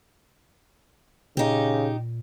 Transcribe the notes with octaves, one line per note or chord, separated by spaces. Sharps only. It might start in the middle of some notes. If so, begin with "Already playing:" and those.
A#2 C#3 D#4 G4